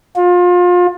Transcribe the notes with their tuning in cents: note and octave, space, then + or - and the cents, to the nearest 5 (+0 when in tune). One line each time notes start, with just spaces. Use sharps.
F4 +30